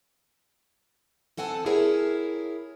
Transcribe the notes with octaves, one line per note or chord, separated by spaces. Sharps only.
C4 A4 F#5 G#5 A5
E4 G#4 A#4 C#5